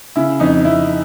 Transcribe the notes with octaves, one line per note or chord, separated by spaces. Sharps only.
C#3 E4
F2 D#4
F2 E4